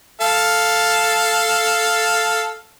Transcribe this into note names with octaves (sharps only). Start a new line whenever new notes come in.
A4 F5 A5